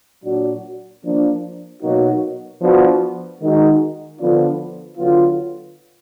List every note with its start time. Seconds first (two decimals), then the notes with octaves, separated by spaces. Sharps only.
0.24 A#2 F#3 D4 F#4
1.03 F3 A#3 D4
1.82 B2 F#3 A#3 D#4 F#4
2.61 F3 B3 D4 F#4
3.40 D#3 G#3 D#4 F#4
4.19 D3 F3 B3 D4 F4
4.98 D3 F#3 B3 F4